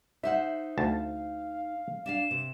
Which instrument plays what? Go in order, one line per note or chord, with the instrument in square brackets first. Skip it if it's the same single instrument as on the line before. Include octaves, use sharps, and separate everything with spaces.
[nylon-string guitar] D#4 C5 F#5 [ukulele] E5
[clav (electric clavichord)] D2 A5 [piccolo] F5
[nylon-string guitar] D4 E5 F5 [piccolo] E7
[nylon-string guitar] C3